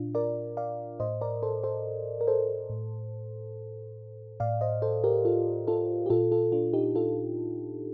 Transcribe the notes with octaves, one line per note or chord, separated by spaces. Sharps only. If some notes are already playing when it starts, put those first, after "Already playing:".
Already playing: A#2 D4 F4
A#4 D5
D5 F5
A2 C5 D#5
A#4 D5
A4 C5
A4 C5
A#4
A4 C5
A2
A2 D5 F5
C5 D#5
A4 C5
G4 A#4
F4 A4
F4 A4
G4
A#2 F4 A4
F4 A4
D4 F4
D#4 G4
F4 A4